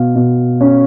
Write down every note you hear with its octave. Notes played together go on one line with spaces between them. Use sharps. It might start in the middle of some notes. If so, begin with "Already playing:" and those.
Already playing: B2 F5
B2
C#4